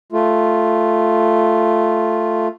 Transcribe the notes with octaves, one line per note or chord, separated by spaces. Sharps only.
A3 F4